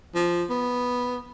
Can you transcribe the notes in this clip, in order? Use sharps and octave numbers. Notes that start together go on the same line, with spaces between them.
F3
B3